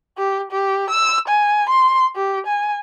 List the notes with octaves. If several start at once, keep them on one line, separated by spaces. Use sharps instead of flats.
G4
G4
E6
G#5
C6
G4
G#5